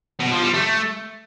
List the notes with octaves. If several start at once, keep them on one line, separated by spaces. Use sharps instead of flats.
B2
F3
G3
A3